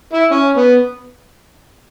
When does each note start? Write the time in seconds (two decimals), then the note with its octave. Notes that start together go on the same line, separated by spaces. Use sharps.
0.13 E4
0.31 C#4
0.57 B3